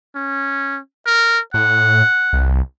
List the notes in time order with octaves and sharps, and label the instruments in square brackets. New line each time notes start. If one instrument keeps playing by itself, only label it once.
[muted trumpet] C#4
A#4
[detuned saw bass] A2 [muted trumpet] F#5
[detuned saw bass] C2